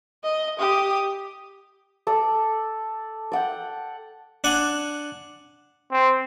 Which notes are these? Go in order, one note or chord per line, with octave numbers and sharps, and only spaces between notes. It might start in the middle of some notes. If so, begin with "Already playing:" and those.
D#5
G4 D#6
A4 D5
D5 F#5 G5
D4 F#5 G#5
C4